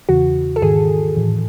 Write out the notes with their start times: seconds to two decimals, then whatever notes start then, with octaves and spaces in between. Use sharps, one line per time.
0.09 E2 C#3 E3 F#4
0.56 A4
0.62 G#2 D#3 G#4
1.16 A2 E3